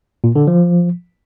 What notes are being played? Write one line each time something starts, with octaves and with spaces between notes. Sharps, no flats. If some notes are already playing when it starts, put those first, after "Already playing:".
A#2
D3
F3